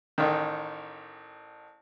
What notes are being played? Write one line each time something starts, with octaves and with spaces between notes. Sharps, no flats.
A1 D#3